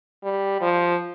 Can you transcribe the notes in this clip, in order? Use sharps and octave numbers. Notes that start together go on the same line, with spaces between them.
G3
F3